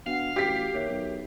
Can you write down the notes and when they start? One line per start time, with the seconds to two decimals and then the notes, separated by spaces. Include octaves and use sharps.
0.06 B2 D4 F5 F#5
0.36 A1 F#4 G4 G5 B6
0.74 D#2 A#4 C#5 E5
0.89 B1